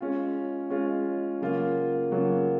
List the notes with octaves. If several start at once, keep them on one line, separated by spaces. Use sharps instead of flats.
G#3 C#4 F4
G#3 C#4 F4
C#3 F#3 A#3 F4
C#3 F#3 A#3 F4